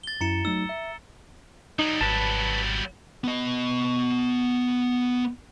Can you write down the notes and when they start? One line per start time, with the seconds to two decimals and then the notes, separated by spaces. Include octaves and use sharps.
0.03 A6 G7
0.21 F#2 E4 A#5 C#7 E7
0.45 F#3 A3 D#4 E6
0.69 E5
1.79 F#3 G3 D#4
2.01 G#1 B4 A5
3.24 B3 D#5